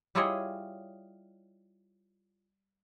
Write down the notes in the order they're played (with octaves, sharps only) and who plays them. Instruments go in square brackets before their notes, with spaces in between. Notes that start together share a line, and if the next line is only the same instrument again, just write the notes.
[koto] G3 E4 F4 G#4 C#5 D#5